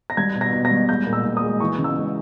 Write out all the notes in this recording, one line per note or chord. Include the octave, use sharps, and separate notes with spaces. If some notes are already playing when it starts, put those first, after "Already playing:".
A#6
G3 G#6
B2
A#6
B2
A#6
G3
G#3 G6
A#2
E6
A#2
D#6
G#3
E3 C#6
C#3
E6
G#3